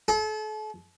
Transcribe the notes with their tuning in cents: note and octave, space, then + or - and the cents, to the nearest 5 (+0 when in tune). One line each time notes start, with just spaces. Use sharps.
A4 -40